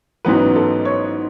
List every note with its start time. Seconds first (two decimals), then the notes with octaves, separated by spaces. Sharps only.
0.25 A1 G#2 F#3 B3 B4
0.56 A4
0.85 C#5